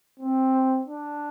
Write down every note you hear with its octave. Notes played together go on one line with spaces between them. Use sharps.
C4
D4